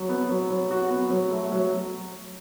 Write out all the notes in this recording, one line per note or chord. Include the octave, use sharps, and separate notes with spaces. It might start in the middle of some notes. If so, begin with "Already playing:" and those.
Already playing: F#3
B3
F#3
F#3
F#4
B3
F#3
A3
F#3